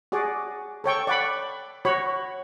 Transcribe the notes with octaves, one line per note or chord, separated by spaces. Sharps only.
F#4 G#4 D5
A4 C#5 G5 C#6
D5 F#5 B5
F#4 C#5 B5